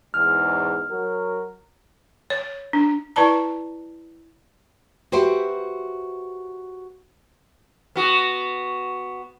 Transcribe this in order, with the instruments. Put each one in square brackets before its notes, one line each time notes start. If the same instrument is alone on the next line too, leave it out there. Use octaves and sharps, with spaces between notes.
[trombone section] E2 G#2 [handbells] F6
[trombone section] F#3 F#4 A#4
[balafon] C#5
D4
E4 B4 D5 A5 A#5
[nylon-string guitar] F#4 G4 B4 C5 E5 G5
[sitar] B3 F#4